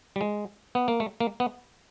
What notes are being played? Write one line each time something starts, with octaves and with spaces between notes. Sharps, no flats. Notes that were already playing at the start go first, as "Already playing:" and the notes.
G3
G#3
B3
A#3
A3
A#3
B3